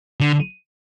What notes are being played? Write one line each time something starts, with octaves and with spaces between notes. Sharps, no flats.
D3